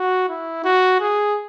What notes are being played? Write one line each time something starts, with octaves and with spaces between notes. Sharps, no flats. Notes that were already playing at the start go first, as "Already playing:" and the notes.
Already playing: F#4
E4
F#4
G#4